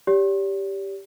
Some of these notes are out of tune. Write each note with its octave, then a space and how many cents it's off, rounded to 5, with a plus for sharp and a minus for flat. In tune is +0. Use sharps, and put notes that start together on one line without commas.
G4 +0 D5 -45